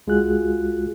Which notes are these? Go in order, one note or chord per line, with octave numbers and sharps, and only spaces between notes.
C#2 G#3 F4 F#4 G#4 F#6